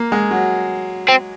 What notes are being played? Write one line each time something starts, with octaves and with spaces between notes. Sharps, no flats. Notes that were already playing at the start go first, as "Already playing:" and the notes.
Already playing: A#3
G#3
F#3
C4